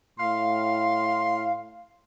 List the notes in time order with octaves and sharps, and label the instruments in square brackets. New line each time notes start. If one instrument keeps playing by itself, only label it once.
[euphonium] A2 [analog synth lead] F5 [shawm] C6